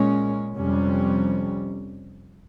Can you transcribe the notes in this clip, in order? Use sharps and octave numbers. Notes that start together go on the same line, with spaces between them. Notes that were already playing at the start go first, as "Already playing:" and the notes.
Already playing: A#2 G#3 C#4
F2 C3 G3 C#4